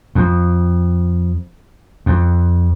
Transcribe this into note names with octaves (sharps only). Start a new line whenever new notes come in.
F2
F2